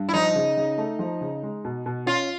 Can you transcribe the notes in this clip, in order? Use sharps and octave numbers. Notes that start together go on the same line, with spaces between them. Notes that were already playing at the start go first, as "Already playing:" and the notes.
Already playing: G2
E4
F3 D#4
C#3
C#3
A3
F3
C#3
G#3
B2
B2
C#4 F4